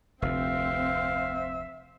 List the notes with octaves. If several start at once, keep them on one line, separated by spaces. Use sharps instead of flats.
F1 D2 C4 E5 F5